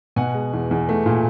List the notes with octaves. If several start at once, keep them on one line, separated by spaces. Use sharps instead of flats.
B2 F#5 G#5
G#3
E2
E2
A3
A#2